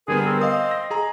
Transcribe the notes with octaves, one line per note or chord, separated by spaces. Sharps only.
D3 G3 B3 G#4 A#4
C4
D#5 F5 D#6
A#6
G#4 A#5